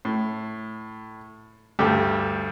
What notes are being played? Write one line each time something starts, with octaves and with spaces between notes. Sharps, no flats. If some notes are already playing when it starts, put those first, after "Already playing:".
A2
D2 G2 A3 G4